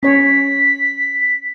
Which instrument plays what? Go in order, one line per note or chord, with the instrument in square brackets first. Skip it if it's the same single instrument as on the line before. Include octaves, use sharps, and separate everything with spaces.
[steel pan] C#4 C#5 [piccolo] B6